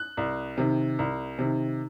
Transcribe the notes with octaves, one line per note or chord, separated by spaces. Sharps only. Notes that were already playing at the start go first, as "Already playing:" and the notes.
Already playing: F#6
C2
C3 D#3
C2
C3 D#3